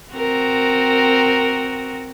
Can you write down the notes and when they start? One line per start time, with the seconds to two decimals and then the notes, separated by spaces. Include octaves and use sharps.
0.13 C4 F#4 A#4